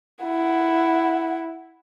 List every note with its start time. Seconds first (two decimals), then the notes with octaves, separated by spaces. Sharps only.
0.24 E4 F#5